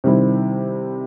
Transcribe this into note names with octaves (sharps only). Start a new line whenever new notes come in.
C3 D#3 G3 C4 E4